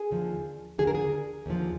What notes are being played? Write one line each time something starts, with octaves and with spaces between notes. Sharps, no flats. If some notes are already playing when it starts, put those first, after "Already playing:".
Already playing: G#4
D#2 D3 F3
D#2 D3 F3 G#4
A#4
G#4
D#2 D3 F3